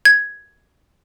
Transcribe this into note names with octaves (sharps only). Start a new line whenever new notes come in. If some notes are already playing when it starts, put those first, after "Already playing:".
G#6